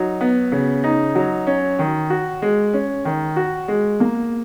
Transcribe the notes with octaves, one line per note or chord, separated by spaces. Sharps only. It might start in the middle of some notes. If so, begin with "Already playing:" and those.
Already playing: F#3 D#4
B3
C#3
D#4
F#3
C#4
D#3
F#4
G#3
C#4
D#3
F#4
G#3
A#3